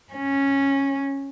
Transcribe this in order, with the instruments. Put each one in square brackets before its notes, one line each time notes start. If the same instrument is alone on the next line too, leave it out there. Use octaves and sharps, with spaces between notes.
[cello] C#4